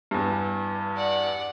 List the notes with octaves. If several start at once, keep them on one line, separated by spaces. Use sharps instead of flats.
E2 G2
D5 F#5